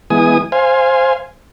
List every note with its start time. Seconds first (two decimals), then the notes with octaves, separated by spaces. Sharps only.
0.10 E3 G#3 B3 G#5 D#6
0.52 C5 F5 G#5